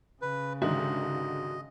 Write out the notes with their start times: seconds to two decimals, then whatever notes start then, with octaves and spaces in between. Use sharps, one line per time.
0.22 C#3 B4
0.62 G#2 D3 D#3 F#4 G4 D#5 E5